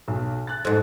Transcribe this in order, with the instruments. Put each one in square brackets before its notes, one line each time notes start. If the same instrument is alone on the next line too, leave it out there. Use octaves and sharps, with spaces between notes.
[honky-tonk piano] B1
F#6 A6
[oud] F2 G#2